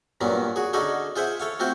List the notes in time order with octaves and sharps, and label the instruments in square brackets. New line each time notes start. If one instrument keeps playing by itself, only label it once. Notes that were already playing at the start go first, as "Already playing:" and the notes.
[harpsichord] G2 A#2 F#3 B3 C#4
F#4 G#4
D3 C#4 D#4 F#4 G#4 A4
F4 G#4 C5 E5 F#5
A4 C#5 F5
A3 C4 F4 F#4 C5